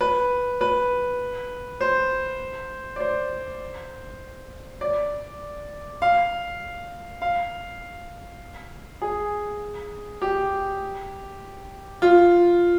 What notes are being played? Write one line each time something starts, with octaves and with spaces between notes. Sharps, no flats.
B4
B4
C5
D5
C5
D5
F5
F5
G#4
G4
F4